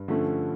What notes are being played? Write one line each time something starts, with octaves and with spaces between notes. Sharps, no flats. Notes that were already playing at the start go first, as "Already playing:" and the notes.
Already playing: G2
D3 F3 A3 C#4